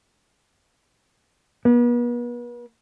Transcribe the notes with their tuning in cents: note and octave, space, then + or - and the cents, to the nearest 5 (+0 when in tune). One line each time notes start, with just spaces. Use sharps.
B3 -40